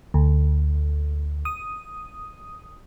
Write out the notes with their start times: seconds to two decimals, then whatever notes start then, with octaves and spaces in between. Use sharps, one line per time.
0.14 D2
1.45 D#6